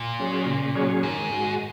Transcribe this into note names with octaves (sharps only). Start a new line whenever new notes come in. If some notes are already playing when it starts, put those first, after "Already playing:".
Already playing: A#2
F#3 C#4 G#4 C#5
C#3
F#3 C#4 G#4 C#5
G#2 D#3
G#3 F#4